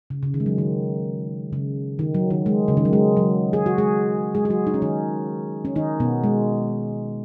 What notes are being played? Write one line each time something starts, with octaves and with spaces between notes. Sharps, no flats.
C#3
C#3
D#3
G#3
F#3
D#3
C#3
D#3
F#3
D#3
G#3
C#3
D#3
F#3
G#3
F#3
G#4
F#4
G#3 G#4
G#3 G#4
G#4
F#3 F#4
D#4
C#4
D#3 D#4
C#4
D#3 D#4
B2 B3
G#3